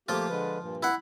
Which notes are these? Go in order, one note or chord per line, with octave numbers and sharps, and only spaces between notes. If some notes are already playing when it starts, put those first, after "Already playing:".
F3 A3 A#3 F4 G4
D3 G#3 B4
G2 A#2
E4 F#5